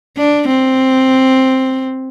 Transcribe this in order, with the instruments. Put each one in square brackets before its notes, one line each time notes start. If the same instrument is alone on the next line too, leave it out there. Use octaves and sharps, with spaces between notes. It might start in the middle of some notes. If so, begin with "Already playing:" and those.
[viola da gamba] D4
C4